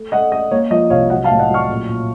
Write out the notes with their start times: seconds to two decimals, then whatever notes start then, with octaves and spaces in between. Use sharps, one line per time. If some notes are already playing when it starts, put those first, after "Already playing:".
Already playing: A3
0.12 A3 D#5 F#5
0.32 A3 D#5
0.51 A#3 C#5
0.71 F3 D#5
0.90 C2 C#5 F5
1.10 F#3 D#5 F#5
1.24 F5 A5
1.30 A2
1.39 D#5 F#5
1.50 F#3 C#6 F6
1.69 A#2
1.89 A#2